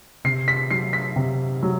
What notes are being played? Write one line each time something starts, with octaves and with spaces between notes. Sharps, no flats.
C3 C7
B6
F#3 C7
B6
C3
F#3